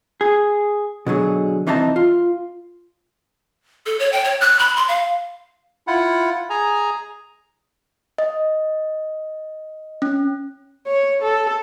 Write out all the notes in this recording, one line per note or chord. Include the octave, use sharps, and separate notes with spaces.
G#4
B2 D3 F#3 G#4
C2 E3 C4 D#4 E5 A5
F4
A4
C#5
G5
C#5
F#6
B5
C6
F5
E4 F4 F#5
G#4 G#5 A#5
D#5
C#4
C#5
A4